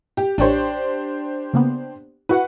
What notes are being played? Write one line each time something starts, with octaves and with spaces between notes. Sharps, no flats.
G4
A1 D4 G4 C5 C#5
C#3 A#3 B3
E4 F#4 B4 F#5